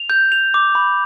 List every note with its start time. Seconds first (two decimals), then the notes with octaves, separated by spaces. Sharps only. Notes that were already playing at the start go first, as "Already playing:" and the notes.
Already playing: F7
0.10 G6
0.32 F7
0.54 D6
0.75 B5